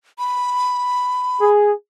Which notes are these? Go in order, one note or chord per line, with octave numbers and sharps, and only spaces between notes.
B5
G#4